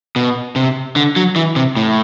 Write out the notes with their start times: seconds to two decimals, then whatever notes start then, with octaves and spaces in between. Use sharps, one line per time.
0.16 B2
0.56 C3
0.96 D3
1.16 F#3
1.36 E3
1.56 C3
1.77 A2